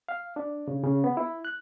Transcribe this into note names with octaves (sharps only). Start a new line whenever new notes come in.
F5
D4
C#3
C#3
B3
E4
F#6